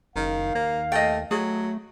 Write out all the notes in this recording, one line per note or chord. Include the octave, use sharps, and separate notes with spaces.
F#1 D#3 F5
D#2 A#3
A3 D#5 G5
F#3 A3 G#4